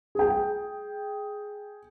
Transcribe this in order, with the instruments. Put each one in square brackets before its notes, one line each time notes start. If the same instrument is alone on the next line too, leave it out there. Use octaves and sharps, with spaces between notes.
[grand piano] G#4 G5